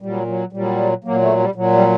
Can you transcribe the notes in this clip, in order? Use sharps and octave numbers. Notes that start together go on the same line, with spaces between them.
A#2 F#3 G3
F#3
A#2 F#3 G3
A#2 F#3 A#3
A3
G3
A#2 F#3
G3